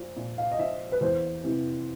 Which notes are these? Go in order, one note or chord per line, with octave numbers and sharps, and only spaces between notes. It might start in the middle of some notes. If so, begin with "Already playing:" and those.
Already playing: A#2 F3
A#2
F5
D#5
F3 E5
B4
E2 C5
C3 E3